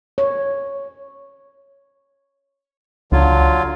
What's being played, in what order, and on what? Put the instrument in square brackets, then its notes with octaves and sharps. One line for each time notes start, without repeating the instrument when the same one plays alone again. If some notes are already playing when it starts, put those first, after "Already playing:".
[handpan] C#5
[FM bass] C#2 [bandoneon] D3 F#3 F4